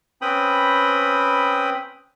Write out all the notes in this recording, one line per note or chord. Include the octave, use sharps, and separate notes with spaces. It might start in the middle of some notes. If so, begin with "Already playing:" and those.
C4 C#4 B4 G5 B5 D#6